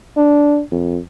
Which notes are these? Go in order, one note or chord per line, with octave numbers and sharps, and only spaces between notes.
D4
F2